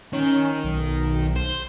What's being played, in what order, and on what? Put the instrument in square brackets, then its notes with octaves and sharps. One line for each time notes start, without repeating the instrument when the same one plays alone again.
[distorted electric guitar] D#3 [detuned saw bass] C#4
[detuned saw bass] B1
[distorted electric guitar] C5